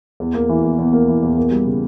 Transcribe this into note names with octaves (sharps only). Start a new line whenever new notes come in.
E2
A#3
E3
E2
E2
A#3
E3
E2
A#3
G3
C#3